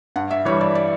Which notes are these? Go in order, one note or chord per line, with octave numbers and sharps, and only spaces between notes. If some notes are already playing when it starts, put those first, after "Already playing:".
G2 F#5
E5
E3 G3 C#5
D5
D5